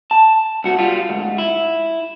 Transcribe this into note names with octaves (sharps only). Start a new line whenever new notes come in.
A5
C2 F#4
G3 F4
D2 G#2
E4